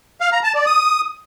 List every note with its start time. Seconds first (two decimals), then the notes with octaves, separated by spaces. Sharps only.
0.21 F5
0.32 A#5
0.43 A5
0.55 D5
0.66 D#6